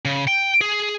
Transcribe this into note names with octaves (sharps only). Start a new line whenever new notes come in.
C#3
G5
G#4